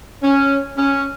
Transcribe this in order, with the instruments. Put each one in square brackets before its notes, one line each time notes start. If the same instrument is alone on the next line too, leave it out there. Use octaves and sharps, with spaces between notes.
[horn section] C#4
C#4